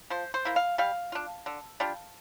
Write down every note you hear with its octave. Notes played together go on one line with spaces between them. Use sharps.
F3 C5
C5
A#3 E4
F5
G3 F5
D4 F4
D3
G3 D4 F4